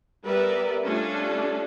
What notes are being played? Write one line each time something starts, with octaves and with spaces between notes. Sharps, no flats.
G3 B3 A#4 B4 D5 E5
G3 A3 C#4 D4 F4 A4